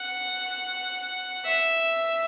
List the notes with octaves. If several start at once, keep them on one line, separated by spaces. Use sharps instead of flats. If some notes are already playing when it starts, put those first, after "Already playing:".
Already playing: F#5
E5